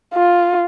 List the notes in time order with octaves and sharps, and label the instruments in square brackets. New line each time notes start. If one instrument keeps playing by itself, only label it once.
[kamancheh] F4